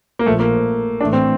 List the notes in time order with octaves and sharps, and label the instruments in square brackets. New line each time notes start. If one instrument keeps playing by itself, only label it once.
[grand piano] A#3
[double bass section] A#1 A#2 F3 [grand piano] A3
[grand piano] A#3
[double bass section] A#1 A2 E3 A3 [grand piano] D4
[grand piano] C4